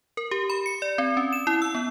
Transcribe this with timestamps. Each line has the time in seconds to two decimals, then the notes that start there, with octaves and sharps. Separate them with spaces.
0.17 A#4
0.31 G4
0.50 B5
0.66 C#7
0.82 D5
0.98 C4
1.17 C#4
1.33 E7
1.47 E4
1.62 E6
1.75 B3